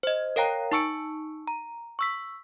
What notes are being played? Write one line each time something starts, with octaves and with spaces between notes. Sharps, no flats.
C5 D#5
A#4 C#5 F5 G5 A#5
D#4 A5 C#6 E6 C#7 D7
A#5
C#6 E6 B6